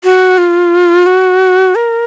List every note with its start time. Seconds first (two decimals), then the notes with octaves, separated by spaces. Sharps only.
0.04 F#4
0.38 F4
1.06 F#4
1.75 A#4